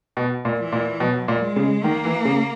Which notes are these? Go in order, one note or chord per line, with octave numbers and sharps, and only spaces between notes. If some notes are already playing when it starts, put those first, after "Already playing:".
B2
A#2
E3
A#2
B2 F#3
A#2
G#3
C#3
D#3 A#3
E3
C#3